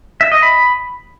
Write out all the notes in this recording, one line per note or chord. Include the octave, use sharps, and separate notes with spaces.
E5
D#5
B5